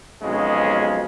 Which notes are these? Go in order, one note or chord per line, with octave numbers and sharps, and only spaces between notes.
B1 F2 C#3 G#3